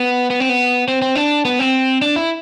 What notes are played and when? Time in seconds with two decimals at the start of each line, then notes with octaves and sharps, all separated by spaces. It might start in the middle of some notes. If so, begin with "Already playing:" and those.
Already playing: B3
0.30 B3
0.40 C4
0.49 B3
0.88 C4
1.02 C4
1.16 D4
1.45 B3
1.59 C4
2.02 D4
2.16 E4